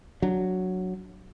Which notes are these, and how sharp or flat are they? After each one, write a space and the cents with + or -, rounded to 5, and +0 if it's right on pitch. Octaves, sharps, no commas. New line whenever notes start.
F#3 +0 D4 +0